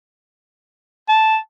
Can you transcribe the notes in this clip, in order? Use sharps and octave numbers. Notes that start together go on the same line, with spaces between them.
A5